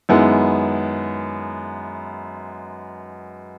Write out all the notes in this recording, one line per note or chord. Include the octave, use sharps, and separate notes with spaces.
F#2 D#3 G#3 B3 E4